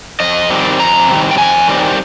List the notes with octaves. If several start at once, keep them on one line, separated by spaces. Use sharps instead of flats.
F2 D#5
D#3 G3 C4
F2 A#5
D#3 G3 C4
G5
F2 G#5
D#3 G3 C4